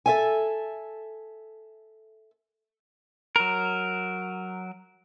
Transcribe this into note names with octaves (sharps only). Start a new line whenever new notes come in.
A4 E5 G#5
F#3 A#4